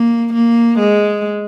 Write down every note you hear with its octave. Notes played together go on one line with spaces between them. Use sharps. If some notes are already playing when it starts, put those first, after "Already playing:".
Already playing: A#3
A#3
G#3